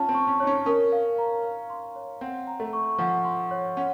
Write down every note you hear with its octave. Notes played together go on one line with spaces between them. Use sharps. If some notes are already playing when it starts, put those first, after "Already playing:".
Already playing: C#4 F4 A5
C4
C#6
C#4
D#4 C#5
C#4
C#4 A#4
F5
A#5
F5
C6
C#5
C4 F#5
A#5
A3
C#6
F3 F#5
C6
C#5
C#4 F#5